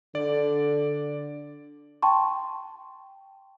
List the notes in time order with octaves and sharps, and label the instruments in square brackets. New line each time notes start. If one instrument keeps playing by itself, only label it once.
[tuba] D3 [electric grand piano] D5
[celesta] G5 A5 C6 C#6